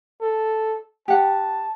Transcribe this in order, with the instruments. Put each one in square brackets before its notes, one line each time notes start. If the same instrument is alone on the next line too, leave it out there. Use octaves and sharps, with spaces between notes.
[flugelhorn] A4
[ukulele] G4 F#5 [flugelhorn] A5